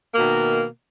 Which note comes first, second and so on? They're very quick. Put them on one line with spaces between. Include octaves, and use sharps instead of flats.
A#3 B2 D#3